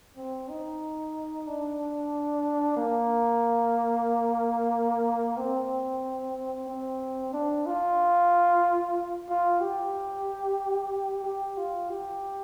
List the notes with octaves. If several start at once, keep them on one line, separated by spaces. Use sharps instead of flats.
C4
D#4
D4
A#3
C4
C4
D4
F4
F4
G4
G4
F4
G4